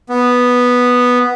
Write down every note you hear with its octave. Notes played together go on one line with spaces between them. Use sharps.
B3